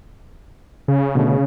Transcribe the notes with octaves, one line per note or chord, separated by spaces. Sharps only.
C#3
B2 D3 A3